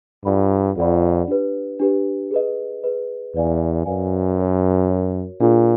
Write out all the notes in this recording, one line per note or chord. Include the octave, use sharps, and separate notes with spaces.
G2 F4 A4 D5 F#5 B5
F2 F4 A4 D5 F#5 B5
D4 G4 B4
D4 G4 B4
G#4 B4 D#5
G#4 B4 D#5
E2 B4 D5 F5 G#5
F#2 B4 D5 F5 G#5
F#4 A#4 C#5
F#4 A#4 C#5
A#2 D4 F4 G#4